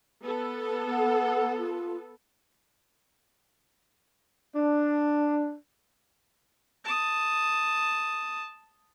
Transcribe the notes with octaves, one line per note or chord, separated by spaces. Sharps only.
B3 A4
F#5
F4
D4
A5 D#6